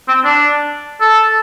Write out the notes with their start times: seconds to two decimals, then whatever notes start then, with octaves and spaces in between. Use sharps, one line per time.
0.08 C4
0.24 D4
1.01 A4